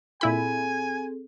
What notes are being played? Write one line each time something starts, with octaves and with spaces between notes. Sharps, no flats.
A#2 C4 E4 G#4 A4 G#5 B5